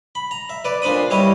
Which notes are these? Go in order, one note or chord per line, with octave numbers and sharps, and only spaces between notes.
B5
A#5
E5
B4 D5
A#2 D4 C5 B5 D#6
G3 E4 C#5 D#5